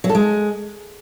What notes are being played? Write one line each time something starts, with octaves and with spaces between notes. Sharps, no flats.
F#3
A4
G#3